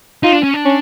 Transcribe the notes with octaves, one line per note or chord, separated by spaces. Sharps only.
D#4 F4
D4
C#4
D4
C#4